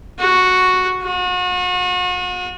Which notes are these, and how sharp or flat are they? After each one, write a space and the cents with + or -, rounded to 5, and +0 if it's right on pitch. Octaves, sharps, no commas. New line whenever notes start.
F#4 -5
F#4 -40